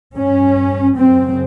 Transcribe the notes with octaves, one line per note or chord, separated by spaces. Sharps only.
G2 C#4
F#2 C#3 C4